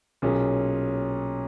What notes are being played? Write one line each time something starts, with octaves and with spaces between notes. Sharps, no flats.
B1 A#2 A#3 C#4 G#4